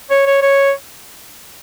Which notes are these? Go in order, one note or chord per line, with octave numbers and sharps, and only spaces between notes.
C#5
C#5
C#5